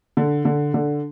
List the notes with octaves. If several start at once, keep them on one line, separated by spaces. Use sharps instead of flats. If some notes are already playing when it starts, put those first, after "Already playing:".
D3
D3
D3